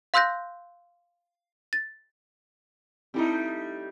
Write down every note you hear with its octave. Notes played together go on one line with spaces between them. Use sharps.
F5 C6 E6 F#6 G6 A#6
A6
G3 A3 C4 D#4 E4